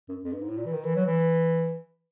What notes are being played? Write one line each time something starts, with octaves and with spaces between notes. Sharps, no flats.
F#2
F2
G2
G#2
A2
A#2
E3
D#3
E3
F#3
E3